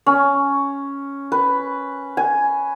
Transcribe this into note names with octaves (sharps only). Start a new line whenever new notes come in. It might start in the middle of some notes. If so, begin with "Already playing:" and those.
C#4
B4
G#5